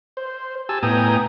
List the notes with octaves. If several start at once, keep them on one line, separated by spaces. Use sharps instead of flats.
C5
G4 G#5 A5 E6
A2 B3 G5 G#5 A#5 D#6